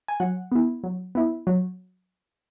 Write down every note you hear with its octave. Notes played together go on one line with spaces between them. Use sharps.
G#5
F#3 F#5
B3 E4
F#3
B3 E4
F#3